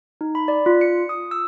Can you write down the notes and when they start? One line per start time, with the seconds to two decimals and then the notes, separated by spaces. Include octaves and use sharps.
0.21 D#4
0.35 B5
0.48 D5
0.66 F4
0.81 C#7
1.09 D#6
1.31 E6